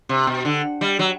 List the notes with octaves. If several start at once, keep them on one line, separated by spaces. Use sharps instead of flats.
C3
B2
D3
G3
F#3